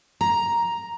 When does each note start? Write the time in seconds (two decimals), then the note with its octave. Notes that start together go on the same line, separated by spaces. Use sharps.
0.21 A#5